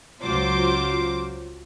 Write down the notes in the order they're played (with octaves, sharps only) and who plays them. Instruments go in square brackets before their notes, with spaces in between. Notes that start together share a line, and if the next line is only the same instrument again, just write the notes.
[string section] C#2 F#3 F4 C5 D6